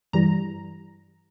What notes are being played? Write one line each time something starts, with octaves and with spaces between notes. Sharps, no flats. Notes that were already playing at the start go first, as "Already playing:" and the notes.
G2 E3 G3 A#5